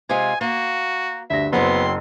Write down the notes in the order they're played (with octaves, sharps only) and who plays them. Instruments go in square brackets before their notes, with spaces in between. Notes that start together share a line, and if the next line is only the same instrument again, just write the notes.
[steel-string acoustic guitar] C3 G#3 F4 [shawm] G#5
[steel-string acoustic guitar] A#3 [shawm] F#4
[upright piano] D2 G2 A#6 [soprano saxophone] E5
[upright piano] F#1 [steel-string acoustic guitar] F#3 C4 F#4 [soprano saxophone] B3 [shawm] C6